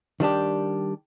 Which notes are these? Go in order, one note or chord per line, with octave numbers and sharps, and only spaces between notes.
D#3 G3 D4 G4